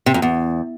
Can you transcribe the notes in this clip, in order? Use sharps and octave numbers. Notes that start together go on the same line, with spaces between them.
C3
F2
E2